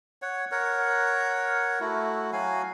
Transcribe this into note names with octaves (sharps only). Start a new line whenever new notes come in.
C#5 F#5
A#4 C#5 F#5
A3 E4 F#4
F#3 F#4 F5 G#5